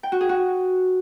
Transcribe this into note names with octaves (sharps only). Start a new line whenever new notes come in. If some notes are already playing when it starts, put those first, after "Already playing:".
G5
F#4
G#4
F#4